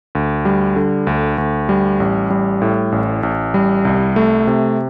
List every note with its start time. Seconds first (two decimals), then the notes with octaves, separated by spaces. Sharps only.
0.15 D2
0.45 G3
0.76 D3
1.07 D2
1.38 D2
1.69 G3
2.00 A1
2.30 G3
2.62 A2
2.92 A1
3.23 A1
3.54 G3
3.85 C2
4.16 A3
4.47 C3